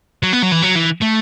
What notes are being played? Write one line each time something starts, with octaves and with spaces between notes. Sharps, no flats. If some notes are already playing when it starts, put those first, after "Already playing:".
F#3
B3
F#3
E3
F#3
E3
A3